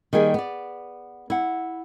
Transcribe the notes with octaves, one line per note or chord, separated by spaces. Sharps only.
D#3 G3 A#3 G#4
B3 D5
E4 F#5